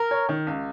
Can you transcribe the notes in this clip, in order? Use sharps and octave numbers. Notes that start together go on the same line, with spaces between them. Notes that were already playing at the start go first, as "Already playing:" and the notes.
Already playing: A#4
C#5
D#3
C#2